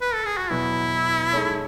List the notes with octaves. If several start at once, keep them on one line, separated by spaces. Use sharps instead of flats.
B4
A4
G#4
F#4
E2 B2 F#3 B3 E4
G#3 D#4 A4 C#5